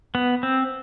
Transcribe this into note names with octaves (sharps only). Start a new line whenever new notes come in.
B3
C4